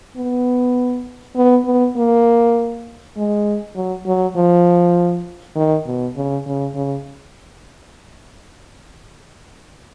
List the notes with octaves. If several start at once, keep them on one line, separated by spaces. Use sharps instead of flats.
B3
B3
B3
A#3
G#3
F#3
F#3
F3
D#3
B2
C#3
C#3
C#3